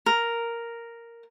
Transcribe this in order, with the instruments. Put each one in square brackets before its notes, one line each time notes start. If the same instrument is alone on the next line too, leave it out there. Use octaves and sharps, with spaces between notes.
[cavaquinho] A#4